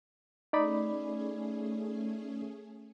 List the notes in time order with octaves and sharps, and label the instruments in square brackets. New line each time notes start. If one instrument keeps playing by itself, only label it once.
[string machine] A3 C#4 G#4 [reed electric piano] D#4 D5 B5